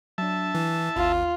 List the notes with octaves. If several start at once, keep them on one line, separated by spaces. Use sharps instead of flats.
F#3 D4 E5 A5
E3 E4
G#1 D#2 F4